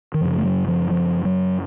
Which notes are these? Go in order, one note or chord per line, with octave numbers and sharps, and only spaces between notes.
D#3
F#2 C#3 F3
A3
F#3
F3
F3
F#3